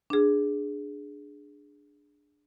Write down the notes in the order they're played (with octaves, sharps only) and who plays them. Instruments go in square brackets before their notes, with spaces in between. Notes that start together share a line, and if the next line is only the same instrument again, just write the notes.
[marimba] D4 G#4